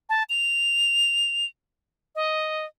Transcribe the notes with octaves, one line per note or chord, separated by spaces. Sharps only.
A5
F7
D#5